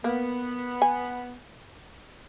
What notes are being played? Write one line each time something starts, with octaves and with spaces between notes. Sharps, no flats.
A#3 B3
G#5